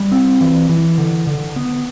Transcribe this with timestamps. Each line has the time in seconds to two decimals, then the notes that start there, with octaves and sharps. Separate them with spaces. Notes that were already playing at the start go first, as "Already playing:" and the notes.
Already playing: G3
0.12 C4
0.41 E3
0.69 E3
0.98 D3
1.27 D3
1.56 B3